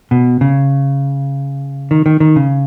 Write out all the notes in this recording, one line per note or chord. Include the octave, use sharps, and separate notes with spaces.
B2
C#3
D#3
D#3
D#3
C#3